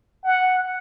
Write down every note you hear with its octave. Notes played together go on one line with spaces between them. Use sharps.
F#5